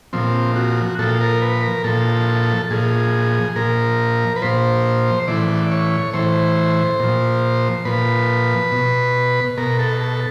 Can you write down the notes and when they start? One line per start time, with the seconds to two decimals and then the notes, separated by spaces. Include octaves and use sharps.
0.13 A#2 F3 C4
0.56 F#4
0.99 A#2 F3 A4
1.21 A#4
1.42 B4
1.63 A#4
1.84 A#2 F3 A4
2.71 A#2 F3 G#4
3.56 A#2 F3 A#4
4.36 B4
4.42 A#2 F3 C5
5.28 A2 E3 D5
5.71 C#5
6.13 A2 E3 C5
7.00 A#2 F3
7.85 A#2 F3 B4
8.72 B2
9.57 B2 A#4
9.79 A4
10.01 A4